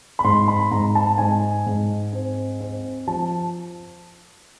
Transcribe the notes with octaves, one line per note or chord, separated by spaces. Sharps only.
B5
G#2 C6
B5
G#2 A#5
A5
G#2 G#5
G#2
C4
C4
F3 A5